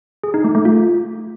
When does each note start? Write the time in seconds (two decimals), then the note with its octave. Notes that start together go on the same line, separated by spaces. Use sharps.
0.24 G#4
0.34 D#4
0.44 A3
0.55 A3
0.65 F4